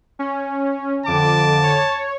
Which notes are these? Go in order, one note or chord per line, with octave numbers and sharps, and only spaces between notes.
C#4
F2 D3 A5 D6
C#5